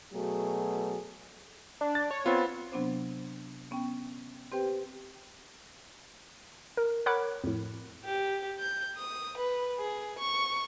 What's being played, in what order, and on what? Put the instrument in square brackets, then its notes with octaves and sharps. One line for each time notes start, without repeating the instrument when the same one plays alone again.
[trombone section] B2 F#3 A3 G#4
[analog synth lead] D4
[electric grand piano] A6
[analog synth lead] C#5
[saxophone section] B3 C4 [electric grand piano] F4
[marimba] C3 F#3 B3 C4 D4 C5
B3 C#4 G5
C4 G4 B4 C5 G5
[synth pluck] A#4
A#4 C#5 F#5 B5 D6 F#6
F2 A2
[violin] G4
G6
D#6
B4
G#4
C#6